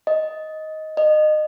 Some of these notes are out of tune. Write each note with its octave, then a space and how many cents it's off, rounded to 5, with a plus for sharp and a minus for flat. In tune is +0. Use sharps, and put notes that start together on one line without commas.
D#5 +10
D#5 -25